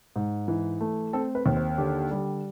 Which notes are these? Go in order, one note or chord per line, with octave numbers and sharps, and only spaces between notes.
G#2
E3
A3
C4 A4
B4
D#2
C5
D3 G4
G3